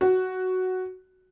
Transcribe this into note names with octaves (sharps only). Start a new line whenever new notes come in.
F#4